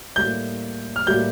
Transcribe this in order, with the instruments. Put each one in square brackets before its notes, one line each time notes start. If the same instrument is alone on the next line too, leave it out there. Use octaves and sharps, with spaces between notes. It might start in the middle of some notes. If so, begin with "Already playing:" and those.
[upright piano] A2 G3 A#3 [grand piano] G6
[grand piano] F6
[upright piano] A2 G3 A#3 [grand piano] G6